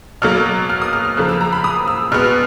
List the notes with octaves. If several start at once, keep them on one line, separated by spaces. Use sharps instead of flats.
B2 F#3 A#3 F6
F6
D#6
F6
F6
C#3 F3 A#3 F#6
E6
A#5
B5
D#6
E6
B2 G#3 B3 F6
F6